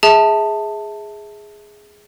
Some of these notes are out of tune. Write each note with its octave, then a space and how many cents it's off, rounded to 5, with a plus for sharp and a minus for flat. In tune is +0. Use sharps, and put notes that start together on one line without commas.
G#4 +0 E5 -25 A5 +10